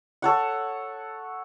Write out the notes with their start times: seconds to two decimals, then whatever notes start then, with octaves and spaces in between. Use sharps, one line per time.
0.22 A4 C#5 F#5